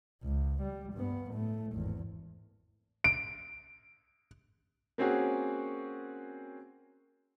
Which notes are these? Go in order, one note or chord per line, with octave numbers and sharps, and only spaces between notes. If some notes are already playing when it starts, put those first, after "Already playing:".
C#2
G3
G2 B3
A2 A3
G#1 E2
D7
A#3 C4 C#4 F#4 G#4